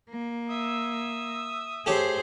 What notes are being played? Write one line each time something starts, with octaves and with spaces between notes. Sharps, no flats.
A#3
E5 D#6 E6
A3 G4 G#4 C5 C#5